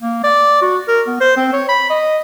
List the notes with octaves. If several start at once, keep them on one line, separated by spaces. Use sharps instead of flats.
A#3
D5
F#4
A#4
B3
C5
C4
C#5
B5
D#5